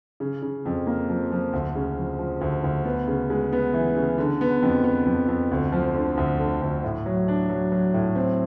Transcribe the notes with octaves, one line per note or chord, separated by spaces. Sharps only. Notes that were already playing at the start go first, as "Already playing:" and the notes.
C#3
C#3
F2
A#3
F3
F3
D2
C#3
F3
F3
D2
D2
B3
C#3
G#3
B3
E3
C#3
D3
B3
F2
B3
F2
F2
D2
F3
D3
D2
D3
D2
A2
F#3
D4
F#3
F#3
A2
C4